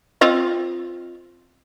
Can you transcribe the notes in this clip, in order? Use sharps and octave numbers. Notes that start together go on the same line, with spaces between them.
C4 F4 D#5